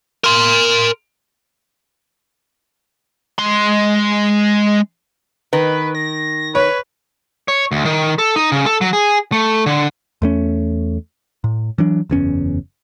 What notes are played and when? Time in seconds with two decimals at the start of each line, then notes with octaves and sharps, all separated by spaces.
0.24 A#4 C6
3.38 G#3 C6
5.53 D#3 B4
5.95 A#6
6.55 B4 C#5
7.48 C#5
7.72 D2
7.85 D#3
8.18 A4
8.36 D#4
8.52 C#3
8.66 A4
8.81 F#3
8.93 G#4
9.32 A3
9.66 D3
10.22 E2 A3 C#4
11.44 A2
11.78 E3 F#3 D4
12.10 F#1 E2 C#4